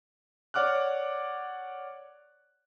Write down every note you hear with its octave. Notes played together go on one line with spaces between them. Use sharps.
C#5 D5 F#5 D6 F6 F#6